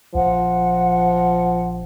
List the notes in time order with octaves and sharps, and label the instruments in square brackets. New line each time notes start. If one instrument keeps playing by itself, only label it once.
[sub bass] A#1 [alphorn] F3 [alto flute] F#5